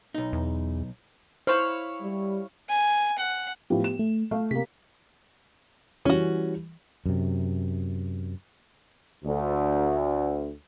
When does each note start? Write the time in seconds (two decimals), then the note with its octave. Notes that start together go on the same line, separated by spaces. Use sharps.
0.15 B1 D#4
0.33 E2
1.47 E4 C5 C#5 F5
2.01 G3
2.69 G#5
3.19 F#5
3.70 A2 F3 B3 G4
3.84 E7
3.99 A3
4.31 A3 F5
4.51 C3 A#3 G4 B6
6.05 E3 G3 C#4 F#4
7.06 F#2 C3
9.24 D2